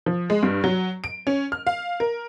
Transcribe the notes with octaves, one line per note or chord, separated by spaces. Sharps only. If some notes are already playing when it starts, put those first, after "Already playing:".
F3
G#3
G2
F#3
D7
C#4
F6
F5
A#4